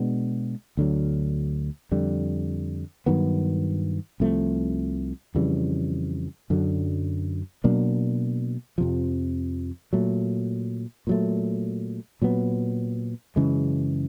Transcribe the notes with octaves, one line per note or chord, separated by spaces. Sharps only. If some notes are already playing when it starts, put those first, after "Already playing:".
Already playing: B2 G#3 B3 D4
D2 D3 F#3
F2 D3 G3
G2 D#3 F#3 B3
C2 C3 F3 A3
F2 C#3 E3 G3
F#2 D3 F#3
B2 F#3 A#3 D4
F2 C3 F3
A#2 F#3 A3
A#2 F#3 A3
A#2 F#3 B3
F#2 C#3 E3 G#3